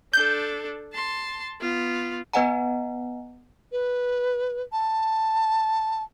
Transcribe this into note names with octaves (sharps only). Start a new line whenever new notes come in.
D4 A4 G6
A5 C6
B3 F4
B3 B4 D#5 F#5 G#5 A#5
B4
A5